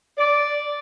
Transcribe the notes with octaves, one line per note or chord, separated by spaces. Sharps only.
D5